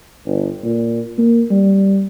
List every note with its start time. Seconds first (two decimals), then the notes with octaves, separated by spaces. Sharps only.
0.26 G1
0.64 A#2
1.18 A#3
1.50 G3